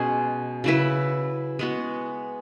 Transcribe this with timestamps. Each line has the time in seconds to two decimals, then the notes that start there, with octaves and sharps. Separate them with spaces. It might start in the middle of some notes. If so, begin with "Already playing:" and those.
Already playing: B2 G#3 C#4 G#4
0.64 C#3 F#3 E4 B4
1.59 G#3 B3 F#4